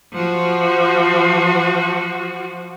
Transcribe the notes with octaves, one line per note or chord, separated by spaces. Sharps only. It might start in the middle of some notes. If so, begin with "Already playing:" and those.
F3 F#4